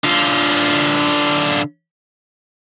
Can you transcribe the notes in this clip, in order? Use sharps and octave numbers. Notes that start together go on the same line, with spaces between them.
D3 F4